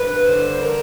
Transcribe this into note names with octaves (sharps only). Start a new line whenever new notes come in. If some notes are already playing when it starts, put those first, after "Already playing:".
Already playing: G2 B4
D3 C5
A#4